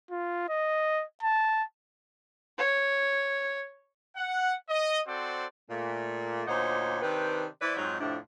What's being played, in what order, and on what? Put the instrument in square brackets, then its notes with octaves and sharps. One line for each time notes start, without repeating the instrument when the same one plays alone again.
[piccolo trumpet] F4
D#5
A5
[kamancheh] C#5
[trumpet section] F#5
D#5
C4 F#4 A4 C5 D5
[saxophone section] A#2 A3
D2 A#2 D#4 C5 C#5 F#5
C3 D#3 C4 D4 B4
E3 E4 B4 C5 D5
F2 G#2 F#3 C4 D#4
F2 A2 C3 F3 D4